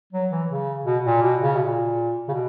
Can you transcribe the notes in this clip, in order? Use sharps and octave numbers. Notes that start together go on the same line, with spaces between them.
F#3
E3
C#3
B2
A#2
B2
C#3
B2
A#2
C#3
B2